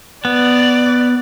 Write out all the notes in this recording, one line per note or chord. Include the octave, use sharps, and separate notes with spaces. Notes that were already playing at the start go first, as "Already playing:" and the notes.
B3 D5